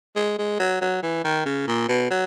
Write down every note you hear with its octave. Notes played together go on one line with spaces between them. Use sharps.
G#3
G#3
F#3
F#3
E3
D#3
C#3
A#2
B2
F#3